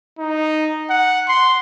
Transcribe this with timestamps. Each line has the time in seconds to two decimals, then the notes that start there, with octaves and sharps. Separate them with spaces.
0.19 D#4
0.90 F#5
1.29 C6